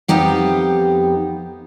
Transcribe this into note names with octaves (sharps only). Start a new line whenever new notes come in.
F2 B3 D#4 G4 F5